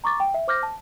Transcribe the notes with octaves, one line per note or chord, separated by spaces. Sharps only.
A#5 C#6 D6 A6
G5
E5
C5 D6 F6 G6 A#6
A5